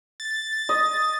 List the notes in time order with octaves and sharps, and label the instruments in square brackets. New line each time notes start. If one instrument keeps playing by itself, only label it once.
[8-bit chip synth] A6
[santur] D#5